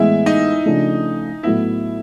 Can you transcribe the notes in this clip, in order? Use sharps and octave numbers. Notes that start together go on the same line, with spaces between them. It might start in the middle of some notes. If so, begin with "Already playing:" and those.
Already playing: A2 E3 G#3 B3 E4 E5
D#4 D#5
C#3 F3 A3 D4
A2 F#3 B3 E4 E5